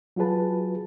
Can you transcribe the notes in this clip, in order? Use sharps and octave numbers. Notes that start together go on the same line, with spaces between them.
F#3 F4 F#4 G#4 B4 A5